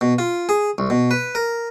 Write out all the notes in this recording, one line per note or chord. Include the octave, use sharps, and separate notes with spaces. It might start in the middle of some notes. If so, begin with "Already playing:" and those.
B2
F4
G#4
C2
B2
B4
A#4